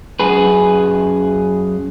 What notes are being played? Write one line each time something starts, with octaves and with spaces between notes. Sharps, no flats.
F#2 G#4 B4